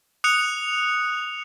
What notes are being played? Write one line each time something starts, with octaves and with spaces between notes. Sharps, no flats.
D#6 F#6 C#7 F7